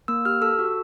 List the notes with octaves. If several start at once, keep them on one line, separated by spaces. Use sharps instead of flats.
A#3 E6
G4 F6
A4 E6
F#4